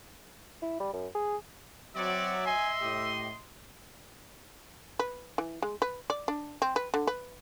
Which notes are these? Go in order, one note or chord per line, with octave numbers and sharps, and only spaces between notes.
E4
G3
F#2
G#4
F#3 C4 F#4 C#5 D5 E5
D#5 G#5 C6
A2 G4
B4
E3
G#3
B4
D5
D4
C4
B4
D3
B4